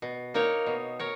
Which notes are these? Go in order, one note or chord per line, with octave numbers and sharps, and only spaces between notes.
B2
A#3 D#4 A#4 C#5
B2
A#4 C#5